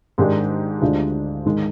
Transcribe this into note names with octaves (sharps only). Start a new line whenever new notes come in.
G#2 D#3 G#3 D4 G4
D2 D3 G#3 D4 F4
G#2 D#3 G#3 D#4